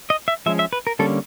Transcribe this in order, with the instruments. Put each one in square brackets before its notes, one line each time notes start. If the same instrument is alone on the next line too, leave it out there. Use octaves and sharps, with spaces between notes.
[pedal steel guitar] D#5
E5
F3 G#3 C#4 E5
E5
B4
A#4
D3 G3 A#3 C#4 A4